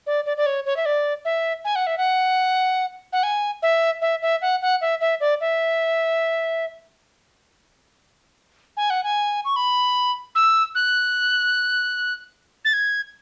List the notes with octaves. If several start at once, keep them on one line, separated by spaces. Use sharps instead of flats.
D5
D5
D5
C#5
C#5
E5
D5
E5
G#5
F#5
E5
F#5
F#5
G#5
E5
E5
E5
F#5
F#5
E5
E5
D5
E5
G#5
F#5
G#5
C#6
B5
E6
F#6
A6
G#6